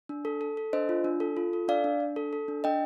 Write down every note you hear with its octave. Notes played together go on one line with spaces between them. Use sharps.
D4
A4
A4
A4
D4 C5 D#5
F4
D4
A4
F4
A4
D4 D5 F5
D4
D4
A4
A4
D4
D4 D#5 G5